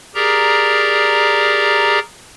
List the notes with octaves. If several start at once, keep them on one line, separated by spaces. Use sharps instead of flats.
G4 G#4 A#4 D5 A#5